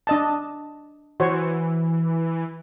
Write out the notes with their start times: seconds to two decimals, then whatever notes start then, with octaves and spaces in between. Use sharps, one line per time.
0.07 D4 D#5 A5
1.20 E3 F#4 C5 C#5